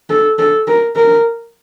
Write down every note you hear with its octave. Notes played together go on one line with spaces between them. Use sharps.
A4
A4
A#4
A#4